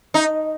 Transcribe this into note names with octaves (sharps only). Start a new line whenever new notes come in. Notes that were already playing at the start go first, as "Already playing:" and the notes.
D#4